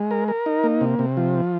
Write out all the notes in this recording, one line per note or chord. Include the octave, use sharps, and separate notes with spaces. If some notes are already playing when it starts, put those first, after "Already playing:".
Already playing: G#3
A#4
A#4
D#4
A#3
C3
C3
F3